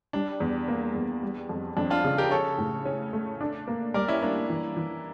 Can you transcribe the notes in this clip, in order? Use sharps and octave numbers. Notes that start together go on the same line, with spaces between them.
G3 D4
E2
A#3
E2
G3
F2
F2 D4
D4 F4
C#3
G4 A#4
C#4 A4 C#5
A2
C#4
A3
D4
A#3
G3 A#4 D5
C#4 E4
A#3 D4
E3
E3